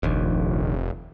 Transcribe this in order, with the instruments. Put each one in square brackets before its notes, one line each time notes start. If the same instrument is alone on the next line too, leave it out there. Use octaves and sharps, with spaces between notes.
[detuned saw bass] F1 [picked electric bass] A#1 D#2